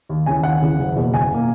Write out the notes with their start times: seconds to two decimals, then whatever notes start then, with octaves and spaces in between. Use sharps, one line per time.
0.09 D#2
0.26 C#3 E3 G#5
0.43 D#2 F#5
0.62 C#3 E3
0.79 F#1
0.96 E2 B2 A#3
1.13 F#1 G#5
1.32 B2 A#3